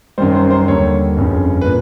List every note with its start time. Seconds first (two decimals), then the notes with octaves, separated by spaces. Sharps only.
0.18 F#2 D#3 G3 C5
0.35 C5
0.50 C5
0.68 D#2 D3 G3 C#5
1.17 G1 F2 C#3
1.61 B4
1.66 A#2